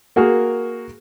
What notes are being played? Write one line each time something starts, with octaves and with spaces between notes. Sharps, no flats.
A#3 F#4 G#4 A#4